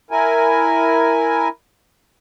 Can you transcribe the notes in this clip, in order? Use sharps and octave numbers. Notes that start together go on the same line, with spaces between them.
E4 A#4 G#5